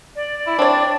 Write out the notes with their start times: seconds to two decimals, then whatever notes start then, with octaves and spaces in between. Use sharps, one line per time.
0.16 D5
0.47 E4
0.59 C4 D4 C#5